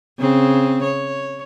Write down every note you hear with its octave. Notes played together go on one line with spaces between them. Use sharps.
C#3 C4
C#5